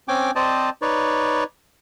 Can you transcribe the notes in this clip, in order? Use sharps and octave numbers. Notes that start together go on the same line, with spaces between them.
C4 C#4 G5 G#5 D6
C4 C5 D5 D#5 A5
D#4 B4 C#5 D5